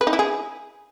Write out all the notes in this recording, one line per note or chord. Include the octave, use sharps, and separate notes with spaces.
B4
D#4
E4
G#4